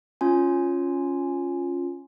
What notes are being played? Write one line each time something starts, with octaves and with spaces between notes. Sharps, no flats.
C#4 F4 G#5